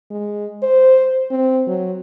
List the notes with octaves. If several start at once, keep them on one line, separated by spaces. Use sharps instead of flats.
G#3
C5
C4
F#3